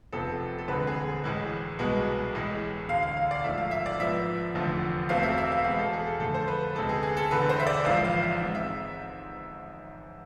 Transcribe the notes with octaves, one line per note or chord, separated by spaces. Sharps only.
F1 F2 C3 F3 B3 A4
A4
E1 D2 D3 G#3 C4 B4
G#4
A1 A2 G#3
C2 B2 G#3 B3
A1 A2 G#3
E1 D2 D3 F5
F5
F5
D5
G#1 G#2 F3 A3 E5
F5
E5
D5
G#2 F3 B3 E5
F1 E2 D3 F3 A3
E1 E2 B2 A3 C4 F5
E5
E5
F5
E2 B2 G#3 B3 F5
A4
G#4
A4
F2 D3 A3 A4
C5
B4
D2 C3 G#3 B3 A4
G#4
G#4
A4
E1 E2 D3 B4
C5
E5
D5
A1 G#2 F3 F5
F5
E5
G#2 G#3 C4
E5